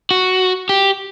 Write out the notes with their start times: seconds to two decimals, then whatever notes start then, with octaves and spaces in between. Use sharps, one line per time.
0.11 F#4
0.69 G4